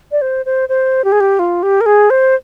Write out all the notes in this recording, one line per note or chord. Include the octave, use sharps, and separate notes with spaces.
D5
C5
C5
C5
G4
G#4
G4
F4
G4
A#4
G#4
C5